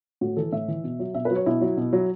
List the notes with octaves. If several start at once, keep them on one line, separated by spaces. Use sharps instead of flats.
A2 F#4
E3 A4
A2 E5
E3
B2
F#3
B2 E5
B4
F#3
C#5
B2 E4
F#3
B2
F#3